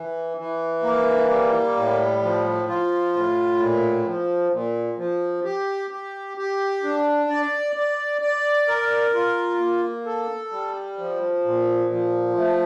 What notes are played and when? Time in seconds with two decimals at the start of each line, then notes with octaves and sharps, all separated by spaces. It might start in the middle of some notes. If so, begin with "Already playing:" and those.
Already playing: E3
0.37 E3
0.83 A#3
1.30 G3
1.76 A2
2.22 F3
2.68 F4
3.14 A2
3.60 A#2
4.06 F3
4.52 A#2
4.98 F3
5.44 G4
5.90 G4
6.37 G4
6.83 D4
7.30 D5
7.76 D5
8.21 D5
8.68 A#4
9.14 F4
9.60 A#3
10.06 A4
10.52 G3
10.98 F3
11.45 A#2
11.91 F3
12.37 A3